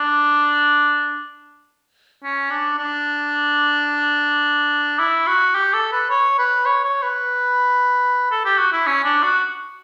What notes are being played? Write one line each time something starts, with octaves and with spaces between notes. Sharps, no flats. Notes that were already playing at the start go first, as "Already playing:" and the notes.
Already playing: D4
C#4
D4
D4
E4
F#4
G4
A4
B4
C#5
B4
C#5
C#5
B4
A4
G4
F#4
E4
C#4
D4
F#4